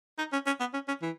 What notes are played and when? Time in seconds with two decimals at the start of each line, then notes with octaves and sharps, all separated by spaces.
0.18 D#4
0.32 C#4
0.46 C#4
0.60 B3
0.73 C#4
0.88 C#4
1.02 E3